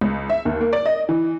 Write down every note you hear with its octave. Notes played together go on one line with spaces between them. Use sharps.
C#2
E5
D#2
A#3
D5
D#5
E3